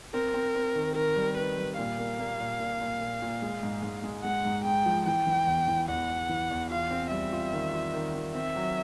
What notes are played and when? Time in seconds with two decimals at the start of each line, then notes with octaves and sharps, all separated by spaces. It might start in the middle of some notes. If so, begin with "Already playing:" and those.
0.14 C4 A#4
0.34 C4
0.55 C4
0.76 D#3
0.96 D#3 A#4
1.16 G3
1.37 D#3 B4
1.57 G3
1.78 A#2 F5
1.98 A#3
2.19 A#3
2.40 A#2
2.60 A#2
2.81 A#2
3.01 A#2
3.22 A#2
3.42 G#3
3.63 G#2
3.83 G#2
4.04 G#3
4.24 G#3 F#5
4.45 G#2
4.65 G#2 G5
4.86 F3
5.06 E3 G5
5.27 E3
5.47 E2
5.68 E3
5.89 E2 F#5
6.09 E2
6.29 E3
6.51 E2
6.70 F4 F5
6.91 C4
7.11 G3 E5
7.33 F4
7.52 D#3
7.73 F4
7.94 D#3
8.15 D#3
8.35 C4 E5
8.56 F#3